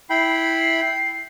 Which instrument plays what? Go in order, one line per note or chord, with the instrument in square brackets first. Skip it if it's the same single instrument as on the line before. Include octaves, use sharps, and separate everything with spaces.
[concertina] E4 G5 B5 [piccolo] C7